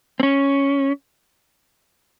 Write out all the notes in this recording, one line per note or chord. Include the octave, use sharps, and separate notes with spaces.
C4
C#4